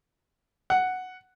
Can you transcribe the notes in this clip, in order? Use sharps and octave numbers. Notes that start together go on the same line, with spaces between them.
F#5